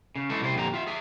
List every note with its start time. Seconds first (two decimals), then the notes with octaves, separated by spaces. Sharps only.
0.16 C#3
0.30 E3 G#3 A3 A4
0.42 C2 C3 E4 G4 C5
0.55 F2 A#2 D3 F4 G4 A#5
0.74 F4 E5
0.87 G#4 E5